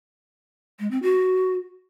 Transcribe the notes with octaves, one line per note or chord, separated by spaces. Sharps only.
G#3
C4
F#4